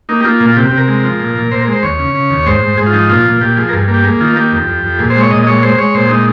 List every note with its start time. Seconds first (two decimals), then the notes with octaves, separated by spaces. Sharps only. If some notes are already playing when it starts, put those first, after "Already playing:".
0.09 A#3 D#4
0.21 G4
0.25 A#3 F4
0.40 A#2
0.46 F4
0.56 C3 G4
0.67 C3 G4
0.78 A#4
0.88 G#3
1.03 F3
1.20 A#2
1.36 A#2
1.51 A#2 C5
1.62 A#4
1.67 G#3 C5
1.83 D#2 C#5
1.99 C#3
2.15 C#3
2.30 D#2
2.46 G#2 C5
2.62 G#2
2.77 G#2 G#4
2.86 F4
2.93 F3 D#4
3.09 A#2 F4
3.25 A#2
3.41 A#2 G4
3.57 F3 G#4
3.69 A#4
3.73 G2 G#4
3.88 A#3
3.94 G4
4.04 A#3 G#4
4.20 D#3 F4
4.36 A#3 G4
4.52 F2
4.67 F2
4.84 F2
4.99 A#2 G#4
5.10 C5
5.15 G#3
5.20 C#5
5.30 A#2 D#5
5.43 D#5
5.47 G#3 C#5
5.62 G#3 C5
5.78 G#3 C#5
5.94 A#2 C5
6.09 G#3 D#4